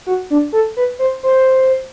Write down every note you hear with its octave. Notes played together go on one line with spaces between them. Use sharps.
F#4
D4
A4
B4
C5
C5